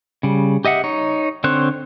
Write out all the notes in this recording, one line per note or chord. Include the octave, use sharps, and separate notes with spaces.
C#3 G3
G4 D#5 E5 F#5
D#4 C#5
D3 C4 C5 C#5 F#6